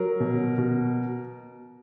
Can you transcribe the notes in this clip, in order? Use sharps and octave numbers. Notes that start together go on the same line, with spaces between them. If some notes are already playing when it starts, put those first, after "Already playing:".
Already playing: F#3 A#4
B2
B2